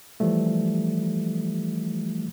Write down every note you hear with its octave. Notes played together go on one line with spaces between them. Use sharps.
E3 F3 G3 A3